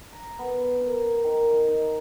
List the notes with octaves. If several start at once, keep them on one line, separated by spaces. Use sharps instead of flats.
A#5
B3
A#4
D#3
D#4